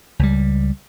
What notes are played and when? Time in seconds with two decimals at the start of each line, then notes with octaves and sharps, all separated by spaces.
0.19 C#2 G3